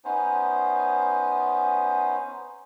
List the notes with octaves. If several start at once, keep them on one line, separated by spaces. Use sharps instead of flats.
B3 C#4 D#4 C5